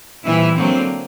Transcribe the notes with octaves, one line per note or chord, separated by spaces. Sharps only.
A#2 E3 G3 C4 E4
D3 F#3 A#3 C4